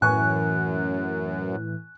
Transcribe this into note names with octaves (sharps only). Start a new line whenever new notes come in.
F#2 A2 E3 G#5 C#6 F#6